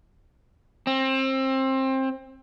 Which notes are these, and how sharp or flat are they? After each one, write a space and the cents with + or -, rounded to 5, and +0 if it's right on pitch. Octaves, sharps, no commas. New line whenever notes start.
C4 +25